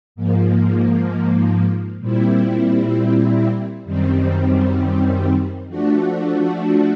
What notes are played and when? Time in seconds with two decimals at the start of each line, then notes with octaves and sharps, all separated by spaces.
0.16 G#2 F3 A#3
2.00 A#2 G3 C4 E4
3.85 F#2 D#3 G3 C4
5.68 F3 A3 D4 F#4